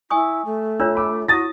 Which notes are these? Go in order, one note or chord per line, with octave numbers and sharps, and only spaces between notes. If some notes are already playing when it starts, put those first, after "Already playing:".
E4 G#5 C#6 D#6
A3
D4 F4 C#5 E6
B5 D6 E6
E4 F#4 D#6 A6 A#6